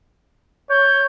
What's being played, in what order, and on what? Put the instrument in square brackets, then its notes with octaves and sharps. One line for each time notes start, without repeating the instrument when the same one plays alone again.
[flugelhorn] C#5 [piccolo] G6